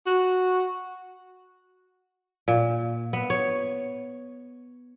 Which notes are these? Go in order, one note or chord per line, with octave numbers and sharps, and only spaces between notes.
F#4
A#2
B3
C#5